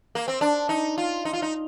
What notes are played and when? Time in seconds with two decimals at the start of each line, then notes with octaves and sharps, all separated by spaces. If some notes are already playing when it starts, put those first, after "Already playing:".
0.15 A#3
0.28 C4
0.41 D4
0.69 D#4
0.98 F4
1.25 D#4
1.33 F4
1.42 D#4